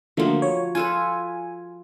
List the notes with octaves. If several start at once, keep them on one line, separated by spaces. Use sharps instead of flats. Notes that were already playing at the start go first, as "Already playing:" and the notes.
D3 F3 F#3 A3 A#3
C#5
F4 A4 B4 G#5